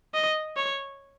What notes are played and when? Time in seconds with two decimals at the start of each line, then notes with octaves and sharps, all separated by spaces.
0.14 D#5
0.56 C#5